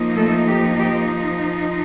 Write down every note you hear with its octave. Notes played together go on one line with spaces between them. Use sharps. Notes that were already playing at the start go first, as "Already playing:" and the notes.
Already playing: F3 A#3 D#4
A3 A4
G4
G4